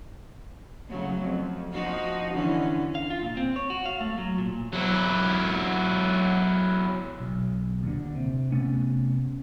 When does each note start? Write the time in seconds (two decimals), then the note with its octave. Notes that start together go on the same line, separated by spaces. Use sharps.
0.87 C#3 F#3 A3
1.21 F2
1.72 F3 D#4 F#4
2.33 D3 E3 C#4
2.95 F5
3.10 F4
3.23 A#2
3.37 C4
3.56 C#5
3.70 F#4
3.86 F5
4.01 A3
4.18 F#3
4.38 A#2
4.73 F#3 E4
7.20 B1
7.83 D#2 A#2 D3
8.15 C3
8.52 C3 A3 B3 C#4